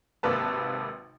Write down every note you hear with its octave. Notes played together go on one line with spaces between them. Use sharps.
G#1 C3 A#3 B4 A5